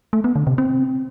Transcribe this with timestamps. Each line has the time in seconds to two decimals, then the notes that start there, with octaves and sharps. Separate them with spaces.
0.13 A3
0.24 B3
0.36 D3
0.47 C3
0.58 C4